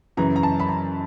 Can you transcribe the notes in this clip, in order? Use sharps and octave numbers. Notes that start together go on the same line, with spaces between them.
F#2 C#3 E3 A#5
A#5
A5
B5
A#5